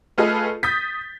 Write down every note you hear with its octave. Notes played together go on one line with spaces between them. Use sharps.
A3 F4 G#4 A4 B4 D#5
D#6 G6 A6 B6